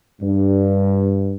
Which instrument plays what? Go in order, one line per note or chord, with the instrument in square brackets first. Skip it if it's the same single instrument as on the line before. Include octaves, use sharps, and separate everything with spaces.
[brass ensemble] G2